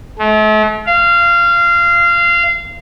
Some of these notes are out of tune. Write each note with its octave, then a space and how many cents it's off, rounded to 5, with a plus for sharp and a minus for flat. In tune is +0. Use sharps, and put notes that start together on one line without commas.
A3 -40
F5 -20